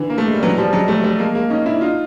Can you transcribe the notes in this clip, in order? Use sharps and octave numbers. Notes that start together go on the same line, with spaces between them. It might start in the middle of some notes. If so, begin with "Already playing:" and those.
Already playing: D3 E3
A#3
A3
G#3
G3
E3 F#3
F3 G3
F#3 G#3
G3 A3
G3 A3
G#3 A#3
G#3 A#3
C#4 D#4
D4 E4
D#4 F4